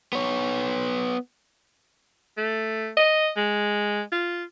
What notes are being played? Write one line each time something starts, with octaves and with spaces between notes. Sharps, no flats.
B3 C#5
A3
D#5
G#3
F4